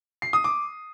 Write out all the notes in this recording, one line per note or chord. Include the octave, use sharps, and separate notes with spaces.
C7
D#6
D6